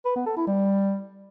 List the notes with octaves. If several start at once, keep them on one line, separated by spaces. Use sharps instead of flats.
B4
B3
A4
E4
G3